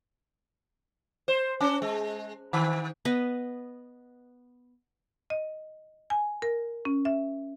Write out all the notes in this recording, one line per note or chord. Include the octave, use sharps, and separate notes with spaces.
C5
C#4
G#3
D#3
B3 B4 D#5
D#5
G#5
A#4
C#4
E5